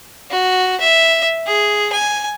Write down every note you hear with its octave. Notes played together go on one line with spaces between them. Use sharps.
F#4
E5
G#4
G#5